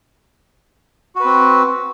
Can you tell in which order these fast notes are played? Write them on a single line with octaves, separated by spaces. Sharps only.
F#4 B4 C4